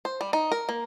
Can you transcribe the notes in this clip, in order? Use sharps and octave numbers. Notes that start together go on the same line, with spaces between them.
C5
G3
D#4
A#4
A#3